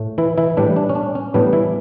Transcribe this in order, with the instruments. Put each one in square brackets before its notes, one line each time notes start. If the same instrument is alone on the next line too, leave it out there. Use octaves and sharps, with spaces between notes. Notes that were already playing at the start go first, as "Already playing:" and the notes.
Already playing: [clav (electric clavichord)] A2 A3
E3 E4
E3 E4
A2 E3 G3 D4
D4
C#4
D4
C#4
A2 E3 G3 B3 D4
E3 E4